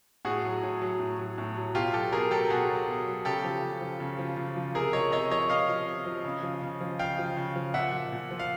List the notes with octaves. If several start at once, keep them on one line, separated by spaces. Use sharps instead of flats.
A2 F#4 G#4
F#3
A2
F#3
A2
F#3
A2
F#3
B2 F4 G4
F#3 G4 A4
B2 G#4 A#4
F#3 G4 A4
B2 F#4 G#4
F#3
B2
F#3
C#3 G4 A4
F3
C#3
F3
C#3
F3
C#3
F3
C3 G#4 A#4
F3 C#5 D#5
C3 C#5 D#5
F3 C#5 D#5
C3 D#5 F5
F3
C3
F3
C#3
F3
C#3
F3
C#3 F5 G5
F3
C#3
F3
A#2 E5 F#5
F3
A#2
F3
F5